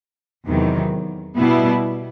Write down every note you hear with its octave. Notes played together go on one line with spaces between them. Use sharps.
E2 C3 D#3 F#3
B2 G3 B3 E4